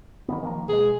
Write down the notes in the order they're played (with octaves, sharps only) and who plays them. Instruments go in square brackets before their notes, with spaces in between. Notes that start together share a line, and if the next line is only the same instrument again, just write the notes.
[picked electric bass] D#3 E3 B3
D#3 F3 A#3
[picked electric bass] B2 G#3 [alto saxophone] G#4